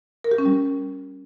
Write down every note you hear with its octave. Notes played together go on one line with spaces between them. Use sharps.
A#4
G4
C#4
G3